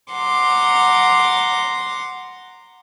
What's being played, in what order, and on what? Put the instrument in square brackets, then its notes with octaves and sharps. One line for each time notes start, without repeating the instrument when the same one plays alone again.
[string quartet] F#5 A#5 C6 D6